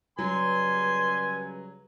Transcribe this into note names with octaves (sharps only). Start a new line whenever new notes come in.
C#3 F#3 G3 B4 G#5 C6